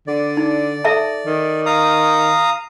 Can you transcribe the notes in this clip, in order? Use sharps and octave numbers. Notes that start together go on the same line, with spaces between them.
D3 D5
D#4
A4 E5 A5
D#3
F5 A#5 D#6